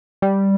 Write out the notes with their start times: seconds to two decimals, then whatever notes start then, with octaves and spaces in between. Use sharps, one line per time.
0.22 G3